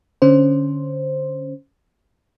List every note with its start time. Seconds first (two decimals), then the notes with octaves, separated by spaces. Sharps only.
0.22 D3 C#4 C5